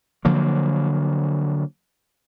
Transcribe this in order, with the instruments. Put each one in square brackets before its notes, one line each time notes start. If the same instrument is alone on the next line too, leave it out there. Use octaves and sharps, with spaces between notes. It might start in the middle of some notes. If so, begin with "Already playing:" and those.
[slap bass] D3 F3 F#3 A#3